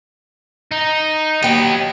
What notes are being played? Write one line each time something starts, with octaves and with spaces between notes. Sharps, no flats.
D#4
D#2 F#3 B3 G5